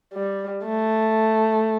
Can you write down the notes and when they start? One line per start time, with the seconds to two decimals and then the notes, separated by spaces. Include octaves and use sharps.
0.13 G3
0.64 A3